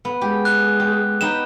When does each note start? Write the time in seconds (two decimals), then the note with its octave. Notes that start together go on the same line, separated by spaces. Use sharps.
0.05 B3
0.21 G#3 G4
0.45 F#6
0.80 G4
1.21 B3 D#4 G4 E7